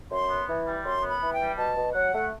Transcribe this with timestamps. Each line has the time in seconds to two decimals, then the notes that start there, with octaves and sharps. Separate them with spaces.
0.11 F#2 C6
0.30 B3
0.48 E3
0.66 G3
0.84 F#2 C6
1.02 B3
1.09 B5
1.21 E3
1.33 G5
1.40 G3
1.58 B2 A5
1.76 B2
1.94 F#3 F#5
2.12 A3